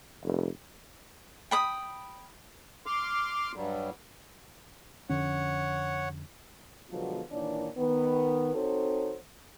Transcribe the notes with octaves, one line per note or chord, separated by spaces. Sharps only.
F1
G5 B5 D#6
C6 D6 F6
G2 F#3 G3
F2 D3 C#4 C#5 F#5
B2 D3 F3 F#3 G#3 B3
A#2 D#3 E3 D4 C#5 D5
D#3 B3
C4 D#4 F#4 A4 C5 C#5